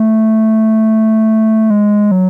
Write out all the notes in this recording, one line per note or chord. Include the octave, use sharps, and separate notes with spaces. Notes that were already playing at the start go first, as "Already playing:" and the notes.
Already playing: A3
G#3
F#3